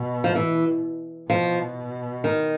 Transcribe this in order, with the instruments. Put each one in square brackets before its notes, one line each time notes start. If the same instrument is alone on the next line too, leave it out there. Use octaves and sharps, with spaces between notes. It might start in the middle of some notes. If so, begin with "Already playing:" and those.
Already playing: [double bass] B2
[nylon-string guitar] F3
E3
[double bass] B2 [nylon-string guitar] F3
[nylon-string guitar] D#3